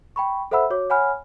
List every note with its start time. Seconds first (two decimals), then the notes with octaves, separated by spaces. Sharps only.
0.16 G5 B5 C#6
0.51 A4 C5 E5 F#5 B5 E6
0.70 F#4 C#5 D6
0.90 C#5 F#5 G#5 B5 F6